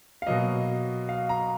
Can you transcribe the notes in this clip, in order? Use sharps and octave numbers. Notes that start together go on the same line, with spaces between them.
F5
B2 F#3 A#3 D#5
F5
A#5